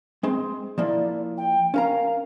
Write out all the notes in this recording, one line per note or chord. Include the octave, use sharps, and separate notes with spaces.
G#3 C4 C6
F3 A#3 E4 D5
G5
C#4 A#4 F5 A#5